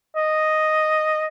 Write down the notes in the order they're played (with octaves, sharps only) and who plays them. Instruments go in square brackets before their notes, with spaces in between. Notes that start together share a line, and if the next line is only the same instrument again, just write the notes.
[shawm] D#5